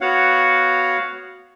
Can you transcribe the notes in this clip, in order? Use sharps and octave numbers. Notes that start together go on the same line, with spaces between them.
B3 F#4 C#5 F5 F#5